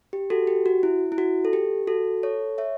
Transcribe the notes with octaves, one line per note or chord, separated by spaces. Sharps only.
G4
F#4 A4
G4
F#4
E4
E4
F#4
A4
G4
F#4 A4
A4 C#5
C#5 E5